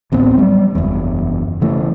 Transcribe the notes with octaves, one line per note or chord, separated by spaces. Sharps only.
D1 A1 B3 C4
F#3 G3
F#1 E2
C#3 E3 A3